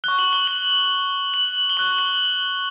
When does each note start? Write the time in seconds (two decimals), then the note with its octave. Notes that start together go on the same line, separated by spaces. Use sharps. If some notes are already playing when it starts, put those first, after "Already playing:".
0.04 F#6 G7
0.08 C#6
0.19 F#7
0.33 G7
0.47 F#7
1.34 F#7
1.70 G7
1.77 C#6 F#6 F#7
1.99 F#7